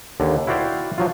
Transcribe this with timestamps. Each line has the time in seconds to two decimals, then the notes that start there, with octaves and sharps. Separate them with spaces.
0.20 D#2 D3
0.47 E4 F#4 C5 D5 F5 G5
0.98 F3 F#3 F4